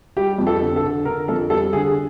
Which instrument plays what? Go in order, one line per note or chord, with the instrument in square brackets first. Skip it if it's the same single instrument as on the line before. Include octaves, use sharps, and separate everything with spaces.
[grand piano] G3 G4
F2
A4
D3
A4
D3
D3 A#4
F2 A4
G3 A4
D3 G#4